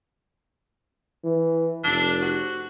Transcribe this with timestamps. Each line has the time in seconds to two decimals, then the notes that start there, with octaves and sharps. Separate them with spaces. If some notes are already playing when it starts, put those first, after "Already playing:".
1.24 E3
1.84 F1 D4
2.22 F#4